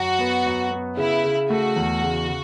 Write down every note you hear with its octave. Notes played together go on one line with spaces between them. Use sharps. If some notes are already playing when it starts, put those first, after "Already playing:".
Already playing: F#2 F#4
B3
F#2
B3
C#3 E4
C#3
A3 F#4
E2
C#3
C#3